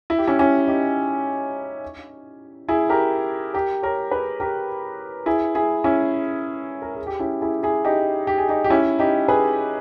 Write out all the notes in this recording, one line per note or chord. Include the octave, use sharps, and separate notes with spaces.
E4
G4
C#4 E4
C#4 E4
D#4 G4
E4 G#4
G4 A#4
G4 A#4
A#4 C#5
G#4 B4
G4 A#4
E4 G#4
E4 G#4
C#4 E4
A#4
G#4
G4
C#4 E4
E4 G#4
E4 G#4
D#4 G4
G4
G#4
D#4 G4
G4
C#4 E4
D#4 G4
G#4 B4